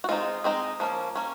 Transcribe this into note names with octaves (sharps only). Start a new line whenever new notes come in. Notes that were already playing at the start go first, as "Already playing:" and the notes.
F#4
G#3 C4 D#4 F4
G#3 C4 D#4
F3 A#3 C#4
A#3 C#4